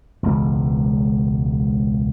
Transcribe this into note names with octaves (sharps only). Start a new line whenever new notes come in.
E1 C#2